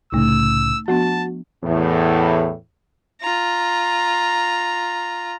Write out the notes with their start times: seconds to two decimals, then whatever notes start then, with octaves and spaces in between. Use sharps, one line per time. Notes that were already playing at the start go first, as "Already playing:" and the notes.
0.12 C2 A2 C#3 A3 D#4 E6
0.88 F3 B3 D4 F#4 A5
1.63 E2 A2
3.21 F4 A#5